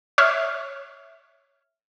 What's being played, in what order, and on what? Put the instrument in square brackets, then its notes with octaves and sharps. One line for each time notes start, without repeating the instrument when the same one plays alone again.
[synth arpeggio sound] C#5 E5 F6